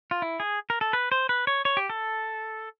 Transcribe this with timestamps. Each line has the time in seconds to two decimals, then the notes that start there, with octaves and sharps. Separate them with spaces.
0.11 F4
0.22 E4
0.40 G#4
0.70 A#4
0.81 A4
0.93 B4
1.12 C5
1.29 B4
1.47 C#5
1.65 C#5
1.77 G4
1.90 A4